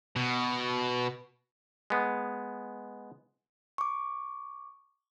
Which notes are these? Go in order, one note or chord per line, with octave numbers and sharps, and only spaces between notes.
B2
G#3 B3
C#6 D6